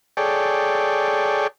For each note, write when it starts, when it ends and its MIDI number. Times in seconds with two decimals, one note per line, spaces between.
0.17 1.47 68
0.17 1.47 69
0.17 1.47 73
0.17 1.47 74
0.17 1.47 79